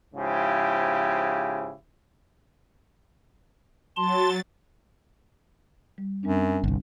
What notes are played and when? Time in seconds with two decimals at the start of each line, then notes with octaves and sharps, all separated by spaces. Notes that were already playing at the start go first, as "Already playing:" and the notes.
0.15 G#2 C#3 F3 E4 G4
3.97 F#3 A5 C6 A6
5.98 G3
6.23 F#2 G3 C4 D4
6.64 G1 C2